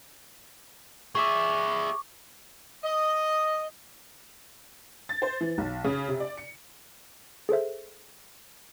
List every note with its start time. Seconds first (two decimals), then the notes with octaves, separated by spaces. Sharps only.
1.15 G#4 E5 C#6 D6
2.83 D#5
5.09 A6
5.22 C5
5.41 E3
5.58 B1
5.84 C#3
6.08 C3
6.20 D5
6.37 C#7
7.49 G#4 A4 C5 E5